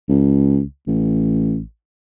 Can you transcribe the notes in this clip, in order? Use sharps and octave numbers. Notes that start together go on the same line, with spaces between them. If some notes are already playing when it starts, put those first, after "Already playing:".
C#2
A1